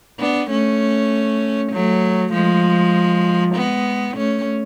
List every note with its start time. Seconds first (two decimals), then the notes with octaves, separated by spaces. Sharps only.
0.19 B3 D4
0.51 A3 C#4
1.73 F#3 A3
2.34 F3 G#3
3.56 G#3 B3
4.17 A3 C#4